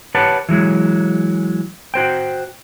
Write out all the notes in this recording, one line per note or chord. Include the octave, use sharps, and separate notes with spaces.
G4 B4 C#5 F#5 A5
E3 F#3 G#3
F#4 C5 G5